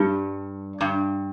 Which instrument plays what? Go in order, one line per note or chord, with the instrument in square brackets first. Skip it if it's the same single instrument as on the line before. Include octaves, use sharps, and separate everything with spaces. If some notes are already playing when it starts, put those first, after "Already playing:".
Already playing: [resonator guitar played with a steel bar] G2 [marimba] G3 D4 G4
[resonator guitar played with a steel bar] G2